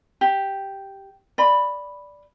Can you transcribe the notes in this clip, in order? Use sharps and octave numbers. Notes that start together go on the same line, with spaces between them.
G4
D5 B5